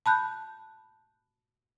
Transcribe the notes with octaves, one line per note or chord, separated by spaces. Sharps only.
A5 B5 F#6 G6